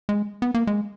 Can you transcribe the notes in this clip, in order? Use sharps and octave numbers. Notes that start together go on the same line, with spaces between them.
G#3
B3
A#3
G#3